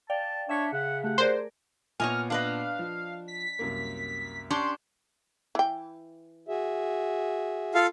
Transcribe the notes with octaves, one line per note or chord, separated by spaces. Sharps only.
D5 F5 G5 A5
D4 C#5 E5 B6 C#7
C#3 F#5
A3 G4 F#5
G#4 A#4 C5 D5
A#2 B3 C#5 D#5 G#5 F6
D4 B4 D#5 F5
F3
B6
C2 F#2 A#3
C#4 D4 G4 C6
E3 G5
F#4 G#4 E5
F4 A4 F5